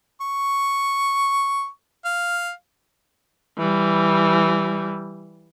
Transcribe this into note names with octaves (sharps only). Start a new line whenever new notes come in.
C#6
F5
E3 G3